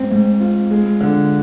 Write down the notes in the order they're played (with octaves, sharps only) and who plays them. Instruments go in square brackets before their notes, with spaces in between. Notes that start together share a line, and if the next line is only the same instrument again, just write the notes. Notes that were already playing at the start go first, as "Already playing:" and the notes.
Already playing: [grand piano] G#2 [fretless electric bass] C4
[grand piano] G#2
F4
G#3
D3